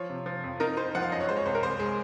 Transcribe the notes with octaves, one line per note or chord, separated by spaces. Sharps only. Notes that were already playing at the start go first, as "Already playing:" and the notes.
Already playing: F3 C#5
C3
F3
F2
D#4 A#4
D#4 C5
F3 F#5
F5
F#2 D#5
C#5
G#3 C5
C#5
C2 C5
A#4
C2 C5
G#3